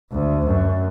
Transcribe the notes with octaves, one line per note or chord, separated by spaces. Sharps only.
D2
F#2